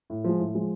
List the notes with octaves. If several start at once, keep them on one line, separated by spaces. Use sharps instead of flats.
A2
F3 G#3
A2
F3 G#3